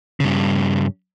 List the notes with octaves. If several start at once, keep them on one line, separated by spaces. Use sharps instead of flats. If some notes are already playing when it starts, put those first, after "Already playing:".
G2 C#3